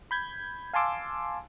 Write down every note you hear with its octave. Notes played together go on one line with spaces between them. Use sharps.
B5 G6 G#6
F5 G#5 A5 C6 D6 E6